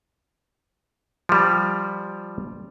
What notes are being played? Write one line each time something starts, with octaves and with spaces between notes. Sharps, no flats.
F3 G3